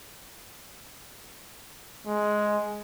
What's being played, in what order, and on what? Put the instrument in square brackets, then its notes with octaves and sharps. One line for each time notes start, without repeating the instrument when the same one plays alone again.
[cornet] G#3